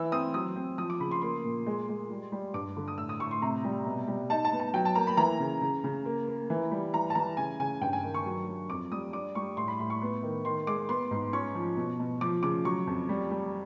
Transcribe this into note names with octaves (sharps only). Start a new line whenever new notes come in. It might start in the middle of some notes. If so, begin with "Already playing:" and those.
Already playing: E3 E6
C4 D#6
F#3 D#6
C4
F3 D#6
D6
C#3 B5
C6
A#3 C6
A#2
G#3
G#3
G3
G3
G2 D6
D3
D#6
A2 E6
D#6
A2 C#6
C6
C3 A#5
G3
B2
G3
D#4 A5
A5
B3
A5
F#3 G5
A5
A#3 A#5
B5
E3 A#5
C#3
C#3
C#3
A#3
A#3
E3
G3
E3 A#5
A5
E3 A#5
C#3 G#5
C#3 G#5
G2 G5
G#5
D#3
C#6
F#3
F#3
F2 D6
G3 D#6
D4 D6
G3 C#6
A2 C6
B5
A2 C6
C#6
B3
D#3
D#3 C6
G#3 D6
B3 C6
G#2
C#4 C#6
F3
B2
B2
F3 D6
C#3 D6
F#3 C#6
F2
G3
G3